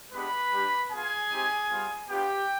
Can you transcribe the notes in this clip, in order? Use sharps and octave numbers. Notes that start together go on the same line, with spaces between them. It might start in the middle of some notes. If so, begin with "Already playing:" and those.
G#3 B3 D4 G4 B4 B5
G3 D4 G4
B3 F4 G#4 G#5
G#3 C4 D#4 G4
G3 B3 F4
B3 D4 F4 G4 G5